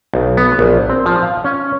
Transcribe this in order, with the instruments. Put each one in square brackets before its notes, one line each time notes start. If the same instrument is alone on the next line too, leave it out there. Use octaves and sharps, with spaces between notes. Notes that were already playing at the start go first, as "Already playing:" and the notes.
[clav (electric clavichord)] B1
B3
A#1
C4
F3
F5
C#4